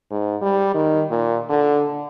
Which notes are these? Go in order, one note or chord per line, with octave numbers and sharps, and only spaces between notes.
G#2
G3
D#3
A#2
D3